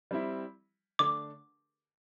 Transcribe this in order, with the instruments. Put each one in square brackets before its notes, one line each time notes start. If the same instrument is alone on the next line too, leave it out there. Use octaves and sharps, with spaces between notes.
[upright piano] G3 C4 E4
[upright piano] D3 A3 D4 [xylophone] D6